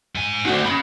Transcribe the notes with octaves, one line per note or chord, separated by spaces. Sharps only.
G#2 G#5
A3 C4 D#4 F#4
C#4 B5